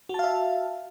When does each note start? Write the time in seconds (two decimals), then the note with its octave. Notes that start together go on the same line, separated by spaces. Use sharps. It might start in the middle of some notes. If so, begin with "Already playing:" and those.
0.09 F#4
0.14 A5
0.19 F5
0.24 E5